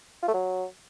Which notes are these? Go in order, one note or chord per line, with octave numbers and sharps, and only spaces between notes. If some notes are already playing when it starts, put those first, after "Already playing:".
F4
A3
F#3